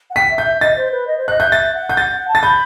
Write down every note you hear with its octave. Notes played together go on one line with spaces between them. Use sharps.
F#5
G5 B6
E5
G6
E5
D#5 A6
C5
B4
D#5
C5
D#5 F#6
E5 G6
E5 A6
F#5
G6
A6
F#5
A5
A6
B5 G6